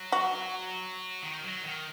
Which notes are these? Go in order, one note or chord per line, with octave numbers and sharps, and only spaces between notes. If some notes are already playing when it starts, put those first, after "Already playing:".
Already playing: F#3
F#4
D#3
F#3
D#3